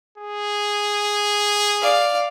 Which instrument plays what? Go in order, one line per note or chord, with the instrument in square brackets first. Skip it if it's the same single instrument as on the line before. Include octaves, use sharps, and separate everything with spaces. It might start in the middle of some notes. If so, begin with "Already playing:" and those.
[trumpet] G#4
[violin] D5 F5